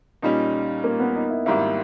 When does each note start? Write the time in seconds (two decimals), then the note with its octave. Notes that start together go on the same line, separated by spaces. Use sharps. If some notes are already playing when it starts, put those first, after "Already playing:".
0.22 A#2 G3 C#4 D#4
0.84 A#3
1.00 B3
1.16 D#4
1.30 E4
1.46 G#1 G#2 G3 A#3 E4